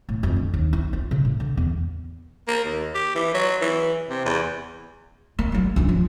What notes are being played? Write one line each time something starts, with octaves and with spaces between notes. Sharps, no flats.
A2
F2
D3
D#2
E4
F4
C#3
A2
D3
E2
A#3
D#2
G4
E3
F#3
E3
C3
E2
A#3
F#3 A#3
C#2 D4
F3